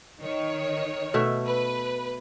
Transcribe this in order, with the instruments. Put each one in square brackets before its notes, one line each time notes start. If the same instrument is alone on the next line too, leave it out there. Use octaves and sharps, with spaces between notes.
[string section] D#3 C#5
[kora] B2 A3 E5
[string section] B4